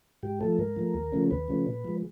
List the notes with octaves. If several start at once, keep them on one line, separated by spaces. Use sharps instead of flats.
G#2 G4
F3 A3 A4
G#2 A#4
F3 A3
D#2
C#3 F3 A3 C#4
D#2 B4
C#3 F3 A3 C#4
A#2
F3 G#3